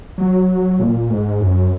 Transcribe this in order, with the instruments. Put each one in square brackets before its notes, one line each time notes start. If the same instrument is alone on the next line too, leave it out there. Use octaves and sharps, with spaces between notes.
[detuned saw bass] F#3
A#2
G#2
F#2